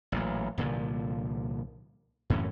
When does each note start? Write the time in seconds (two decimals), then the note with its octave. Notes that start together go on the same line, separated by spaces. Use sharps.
0.12 A1 A#2 F#3
0.58 C2 A#2 D3 F3
2.30 F#2 A2 E3 C#4